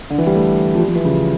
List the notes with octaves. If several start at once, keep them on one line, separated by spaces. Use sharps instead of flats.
D3
E3
G3
A3
F3
G3
F3
E3
C#3